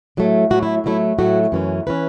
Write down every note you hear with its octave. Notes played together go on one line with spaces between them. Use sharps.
A2 F#3 A3
A2 F#3 A3 F#4
E4
A2 F#3 A3 E4
A2 F#3 A3 F#4
F#2 E3 C#4
E3 C#4 B4